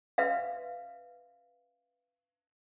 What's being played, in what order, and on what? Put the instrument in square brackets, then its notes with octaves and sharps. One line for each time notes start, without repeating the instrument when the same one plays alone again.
[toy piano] B4 E5 F5